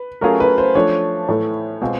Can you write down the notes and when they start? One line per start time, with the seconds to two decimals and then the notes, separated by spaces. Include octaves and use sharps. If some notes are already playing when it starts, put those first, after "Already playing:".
Already playing: B4
0.21 F#3 A3 C#4 F4 G#4 A#4
0.40 B4
0.58 C5
0.75 F3 A3 D4 C#5
1.29 A2 E3 A3
1.81 B2 G#3 C4 F4 G#4 C5